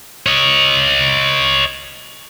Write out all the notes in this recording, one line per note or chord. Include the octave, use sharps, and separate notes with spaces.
C#5 D#5